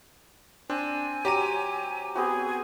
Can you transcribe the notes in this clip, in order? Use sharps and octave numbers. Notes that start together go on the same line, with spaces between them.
C4 D4 G#5
F#3 G4 A#5 D6 D#7
B3 C4 F#4 G#4